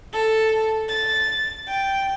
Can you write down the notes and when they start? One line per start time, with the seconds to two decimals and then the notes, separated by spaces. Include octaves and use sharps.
0.12 A4
0.88 A6
1.68 G5